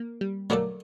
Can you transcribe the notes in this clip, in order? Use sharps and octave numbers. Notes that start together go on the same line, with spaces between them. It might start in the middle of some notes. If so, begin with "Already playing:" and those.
Already playing: A#3
G3
D3 F#3 A3 A#3 D4 A4